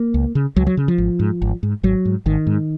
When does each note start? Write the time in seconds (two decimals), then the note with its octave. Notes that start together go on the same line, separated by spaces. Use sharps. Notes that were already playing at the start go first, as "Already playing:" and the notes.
Already playing: A#3
0.14 C#2
0.35 C#3
0.56 C#2 F#3
0.67 F#3
0.77 C#3
0.88 F3
0.98 G#1
1.19 G#2
1.42 G#1
1.63 G#2
1.83 G#1 F#3
2.05 G#2
2.26 G#1 D#3
2.47 G#2